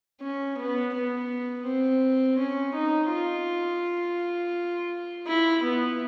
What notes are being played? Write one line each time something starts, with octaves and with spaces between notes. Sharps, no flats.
C#4
B3
B3
C4
C#4
D#4
F4
E4
B3